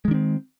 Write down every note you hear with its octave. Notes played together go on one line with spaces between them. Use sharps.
D#3 G#3 C4 D4